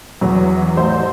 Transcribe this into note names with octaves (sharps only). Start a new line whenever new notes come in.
E2 E3 F#3
A1 C5